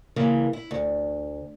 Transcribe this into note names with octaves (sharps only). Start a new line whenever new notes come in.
C#3 E3 A#3
E4
D2